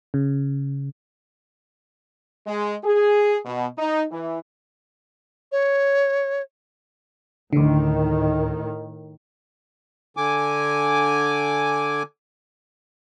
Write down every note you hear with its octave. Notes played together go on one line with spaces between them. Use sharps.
C#3
G#3
G#4
B2
D#4
E3
C#5
D2 A2 D3 D#3
D3 G#5 D6